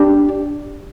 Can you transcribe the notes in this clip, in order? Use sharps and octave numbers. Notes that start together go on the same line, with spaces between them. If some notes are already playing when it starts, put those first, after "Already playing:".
Already playing: D4 G4